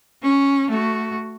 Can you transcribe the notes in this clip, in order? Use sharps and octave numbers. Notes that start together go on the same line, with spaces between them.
C#4
A3 F#4